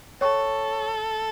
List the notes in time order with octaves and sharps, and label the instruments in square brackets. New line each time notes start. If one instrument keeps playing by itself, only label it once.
[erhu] A4 [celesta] C#5 G5 C#6